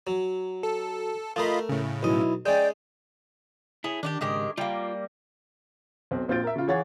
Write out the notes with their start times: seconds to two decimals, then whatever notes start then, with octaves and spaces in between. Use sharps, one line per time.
0.07 F#3
0.63 A4
1.36 A3 F4 A#4 D#5 B5
1.69 A2 C#3
2.03 B1 E4 D#5
2.46 G#3 C#4 D5 G5
3.84 E4 G#4 C#5 E5
4.03 D#3 D4 F#4 G4
4.21 C#2 G#2 D#3 G4 G#4
4.57 G3 A#3 F4 G5
6.11 B1 C4
6.28 A#1 C4 F4 G6 A6 D7
6.44 A#4 E5
6.56 C#3 F4
6.68 E3 G#4 C#5 F5 F#5 A6